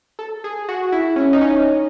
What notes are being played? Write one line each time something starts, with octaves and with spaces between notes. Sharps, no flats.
A4
G#4
F#4
E4
C#4
D#4
C#4